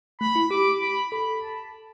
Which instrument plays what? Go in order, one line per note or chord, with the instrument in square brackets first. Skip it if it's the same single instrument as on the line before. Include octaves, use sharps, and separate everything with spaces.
[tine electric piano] A3 [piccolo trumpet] B5
[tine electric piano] E4
[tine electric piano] G4 [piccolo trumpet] D6
[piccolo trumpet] B5
[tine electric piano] A4 [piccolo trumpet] B5
[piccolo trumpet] A5